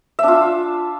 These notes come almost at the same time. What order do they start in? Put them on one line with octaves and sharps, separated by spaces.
E5 D4 F4